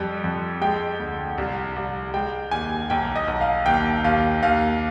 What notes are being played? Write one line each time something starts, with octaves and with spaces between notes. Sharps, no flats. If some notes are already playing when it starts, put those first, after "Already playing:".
Already playing: F2 G3
F2
G#3 G5
D2
C2
C2
G#3 G5
D#2 G#5
B1 G5
D#5
B1
F5
D#2 G5
D#2 F5
D#2 F5